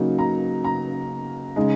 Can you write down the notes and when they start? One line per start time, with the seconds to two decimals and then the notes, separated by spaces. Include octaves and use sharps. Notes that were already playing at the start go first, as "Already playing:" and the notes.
Already playing: C#3 F#3 A#3 D#4
0.19 A#5
0.64 A#5
1.56 C#3 G#3 D#4